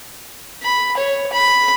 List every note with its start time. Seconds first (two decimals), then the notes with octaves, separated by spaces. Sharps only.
0.63 B5
0.97 C#5
1.33 B5